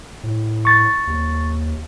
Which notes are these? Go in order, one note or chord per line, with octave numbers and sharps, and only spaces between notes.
A2
C#6 A6
D#2